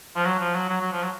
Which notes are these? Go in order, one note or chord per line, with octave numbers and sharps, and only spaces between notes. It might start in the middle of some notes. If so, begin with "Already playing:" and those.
F3
F#3
F3
F#3
F#3
F#3
F3
F#3